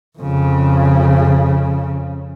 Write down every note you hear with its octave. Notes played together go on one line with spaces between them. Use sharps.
F2 C#3